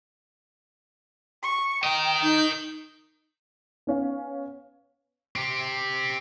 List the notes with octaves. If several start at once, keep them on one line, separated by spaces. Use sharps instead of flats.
C#6
A#4 D#5 G5
D#4 G6
B3 C#4 F5
C4 G4